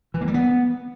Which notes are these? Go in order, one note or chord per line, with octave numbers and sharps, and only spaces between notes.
E3
A#3
G3
B3